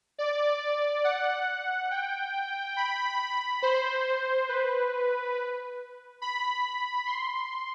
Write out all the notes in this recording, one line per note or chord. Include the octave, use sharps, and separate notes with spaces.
D5
F#5
G5
B5
C5
B4
B5
C6